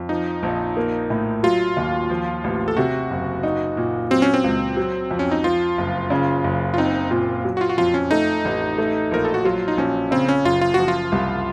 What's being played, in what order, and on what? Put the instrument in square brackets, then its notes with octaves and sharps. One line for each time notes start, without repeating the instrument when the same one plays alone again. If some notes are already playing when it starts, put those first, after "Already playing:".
Already playing: [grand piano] F2
[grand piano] F3 [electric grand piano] D#4
[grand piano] A#1
A#3
A2
[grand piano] F#3 [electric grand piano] F4
[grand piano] D#2
F3
A1
[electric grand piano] A4
[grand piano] C3 [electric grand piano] F#4
[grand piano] F#1
D#4
A#2
[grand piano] F#3 [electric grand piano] C4
[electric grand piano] C#4
C4
[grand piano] C#2
F#3
F2
[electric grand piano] C#4
D#4
[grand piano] F3 [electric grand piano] F4
[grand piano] F#1
C#3
F#1
[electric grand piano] F4
[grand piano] C4 [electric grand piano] D#4
[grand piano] A#2 [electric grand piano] F4
[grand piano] F#3
[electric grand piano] F#4
F4
F#4
[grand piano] F2 [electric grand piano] F4
[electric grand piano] C#4
[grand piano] A3 [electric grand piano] D#4
[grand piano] A1
A3
[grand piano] A#1 [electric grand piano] A#4
[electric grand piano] A4
F#4
[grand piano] F#3 [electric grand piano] F4
[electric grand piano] D#4
[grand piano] A#1 [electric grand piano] C#4
[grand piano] C#3 [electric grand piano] C4
[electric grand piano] C#4
[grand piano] F#1 [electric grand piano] F4
[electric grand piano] F4
[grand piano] F3 [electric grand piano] F#4
[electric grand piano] F4
[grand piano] C2